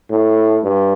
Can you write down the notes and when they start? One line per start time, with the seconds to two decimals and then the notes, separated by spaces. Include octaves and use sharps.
0.10 A2
0.63 G2